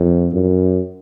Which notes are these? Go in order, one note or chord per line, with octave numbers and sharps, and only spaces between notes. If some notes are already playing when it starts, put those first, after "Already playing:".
Already playing: F2
F#2